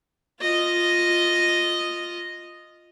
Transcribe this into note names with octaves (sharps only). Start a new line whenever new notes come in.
F4 D#5